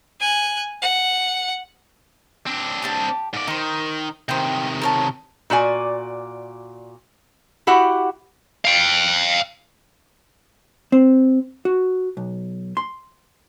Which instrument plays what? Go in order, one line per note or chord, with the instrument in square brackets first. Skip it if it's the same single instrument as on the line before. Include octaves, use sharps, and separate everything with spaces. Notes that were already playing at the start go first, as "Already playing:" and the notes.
[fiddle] G#5 F#6
F#5
[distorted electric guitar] C4 D4
[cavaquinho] G4 G5 A5
[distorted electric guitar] G#2 D5
[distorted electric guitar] D#3 [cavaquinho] D#4 C5
[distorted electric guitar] C3 D#3 [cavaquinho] C5 G5
[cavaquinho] A#4 C#5 A5
[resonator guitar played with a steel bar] A#2 F#4 D5 G#5
E4 F#4 G4 F#5
[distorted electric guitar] F5 G5
[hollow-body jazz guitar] C4
F#4
B1
C6